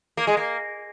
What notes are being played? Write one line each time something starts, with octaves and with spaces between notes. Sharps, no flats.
A#3
G#3
A#3